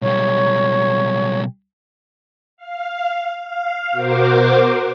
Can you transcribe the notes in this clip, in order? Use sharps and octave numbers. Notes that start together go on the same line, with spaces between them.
B1 G3 C#5
F5
F5
B2 F#4 A#4 C5 D6